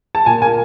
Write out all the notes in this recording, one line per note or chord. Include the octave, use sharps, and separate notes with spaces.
A5
A#2 G#5
A#3 G#5